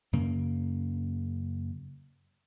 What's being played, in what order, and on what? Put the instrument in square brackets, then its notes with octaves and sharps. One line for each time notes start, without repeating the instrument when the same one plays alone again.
[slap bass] F#2 C#3 A#3